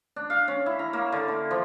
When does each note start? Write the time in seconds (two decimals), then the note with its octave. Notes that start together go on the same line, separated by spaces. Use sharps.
0.16 D4
0.30 F5
0.48 C#4
0.66 E4
0.79 A#5
0.93 A#3
1.12 D3
1.28 D3
1.51 F3